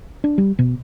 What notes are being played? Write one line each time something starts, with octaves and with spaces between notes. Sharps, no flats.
D4
G3
B2